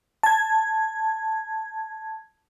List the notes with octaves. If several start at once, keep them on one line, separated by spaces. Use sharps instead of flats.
A5 G#6